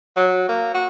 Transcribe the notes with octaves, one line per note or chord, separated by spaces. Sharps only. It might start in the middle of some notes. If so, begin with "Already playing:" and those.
F#3
A#3
F#4